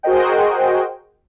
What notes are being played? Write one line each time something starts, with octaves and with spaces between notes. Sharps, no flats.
F#4 G#4 A#4 C5 D#5 G5